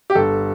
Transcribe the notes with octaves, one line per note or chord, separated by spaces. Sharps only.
G4
G1 A4